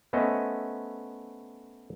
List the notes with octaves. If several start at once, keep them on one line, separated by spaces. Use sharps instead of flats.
A3 B3 C#4 C5 D#5 E5